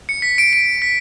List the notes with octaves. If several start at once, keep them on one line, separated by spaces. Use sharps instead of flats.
C#7
B6
D7
D7
B6